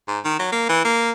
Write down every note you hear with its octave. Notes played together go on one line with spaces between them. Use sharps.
G#2
D#3
F#3
A#3
E3
A#3